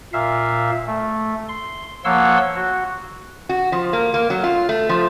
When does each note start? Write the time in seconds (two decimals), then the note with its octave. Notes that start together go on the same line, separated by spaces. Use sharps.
0.13 A#2 E5 F5
0.87 A3
1.49 C6
2.05 F3 A#3 C#5 F#5 C6 E6
2.55 F#4
3.49 F#4
3.72 F3
3.93 A#3
4.14 A#3
4.30 F#3
4.43 F4
4.69 A3
4.89 F3